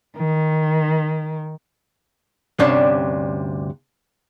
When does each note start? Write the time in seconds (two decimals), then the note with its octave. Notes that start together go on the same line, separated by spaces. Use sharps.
0.17 D#3
2.59 D2 G2 C3 C#4 D4